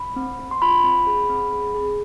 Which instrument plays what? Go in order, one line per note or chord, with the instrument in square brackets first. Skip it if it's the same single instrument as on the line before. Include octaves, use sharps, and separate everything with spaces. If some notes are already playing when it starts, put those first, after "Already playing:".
Already playing: [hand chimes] B5
C4
C4
C6
F4 B5
C4
G#4
C4
G#4
G#4